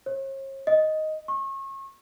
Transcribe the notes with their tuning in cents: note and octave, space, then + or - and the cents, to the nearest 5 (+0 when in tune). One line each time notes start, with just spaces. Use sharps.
C#5 -45
D#5 +5
C#6 -35